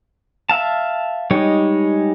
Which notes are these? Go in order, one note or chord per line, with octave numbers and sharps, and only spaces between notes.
E5 F5 A5
G3 G#3 D#4 C#5